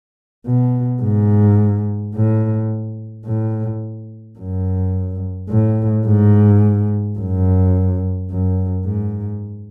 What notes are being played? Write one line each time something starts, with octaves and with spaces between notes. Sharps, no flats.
B2
G#2
A2
A2
F#2
A2
G#2
F#2
F#2
G#2